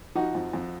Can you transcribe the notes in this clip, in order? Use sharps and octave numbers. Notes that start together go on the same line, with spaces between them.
F3 D#4 F#4
F2
F2